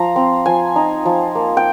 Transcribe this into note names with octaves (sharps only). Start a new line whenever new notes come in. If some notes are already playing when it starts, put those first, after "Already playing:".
Already playing: F3 A#5
C4
F3 G#5
D#4
F3
A#3
G5